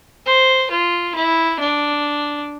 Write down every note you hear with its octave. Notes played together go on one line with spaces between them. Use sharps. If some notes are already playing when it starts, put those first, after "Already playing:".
C5
F4
E4
D4